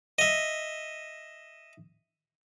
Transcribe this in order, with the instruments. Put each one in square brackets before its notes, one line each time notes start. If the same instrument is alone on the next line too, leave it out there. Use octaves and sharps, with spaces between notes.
[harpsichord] D#5 E5